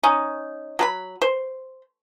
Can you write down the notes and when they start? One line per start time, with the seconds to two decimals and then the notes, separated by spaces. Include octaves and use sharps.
0.03 C#4 D#4
0.79 F#3 A4 B5
1.22 C5